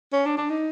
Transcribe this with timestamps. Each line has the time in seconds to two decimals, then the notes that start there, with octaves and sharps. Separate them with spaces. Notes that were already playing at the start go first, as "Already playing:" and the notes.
0.13 C#4
0.26 D4
0.37 D4
0.50 D#4